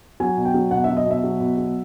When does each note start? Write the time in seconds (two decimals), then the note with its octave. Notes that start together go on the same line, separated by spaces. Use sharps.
0.20 F#3 G#5
0.37 B2
0.45 G5
0.54 F#3
0.71 B2 F#5
0.84 F#3 E5
0.97 D#5
1.06 B2 E5
1.24 F#3
1.40 B2
1.57 F#3